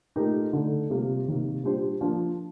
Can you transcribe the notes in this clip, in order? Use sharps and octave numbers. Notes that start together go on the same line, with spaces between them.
A#2 A3 D#4 G4 A#4
D3 A3 D#4 A4
C3 G3 A#3 F4
C3 D#3 A#3
A#2 G3 D4 G4 C5
F3 A#3 D4